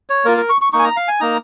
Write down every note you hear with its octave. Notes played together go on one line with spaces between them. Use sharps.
C#5
A#3 F4 A#4
A#4
C#6
C#6
A#3 D#4 C#6
G#5
A#5
F5
G#5
A#3 D#4 A#5